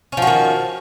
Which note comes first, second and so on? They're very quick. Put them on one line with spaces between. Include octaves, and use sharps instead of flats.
C#4 F3 F#4 D#3